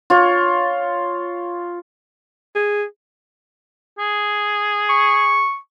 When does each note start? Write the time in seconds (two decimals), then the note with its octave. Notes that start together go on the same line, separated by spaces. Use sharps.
0.10 F4 C#5
2.56 G#4
3.99 G#4
4.89 C#6